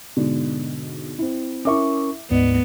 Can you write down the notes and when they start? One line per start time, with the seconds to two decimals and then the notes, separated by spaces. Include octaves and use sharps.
0.16 G#2 B2 D3
1.18 C4 E4
1.65 C#4 E4 A#4 E5 C#6 D6
2.31 D2 G#2 B3 D5 D#5